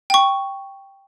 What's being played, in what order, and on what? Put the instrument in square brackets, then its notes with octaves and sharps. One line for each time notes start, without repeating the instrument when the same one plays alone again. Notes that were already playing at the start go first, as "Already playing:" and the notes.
[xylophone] G5 C#6